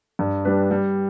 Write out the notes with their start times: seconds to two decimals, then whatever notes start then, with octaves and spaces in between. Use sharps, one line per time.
0.19 G2
0.45 G3 D4 B4
0.71 G3